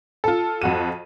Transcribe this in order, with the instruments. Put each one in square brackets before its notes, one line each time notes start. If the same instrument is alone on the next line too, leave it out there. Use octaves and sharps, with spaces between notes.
[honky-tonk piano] F4 A4
F2 F#4 D#7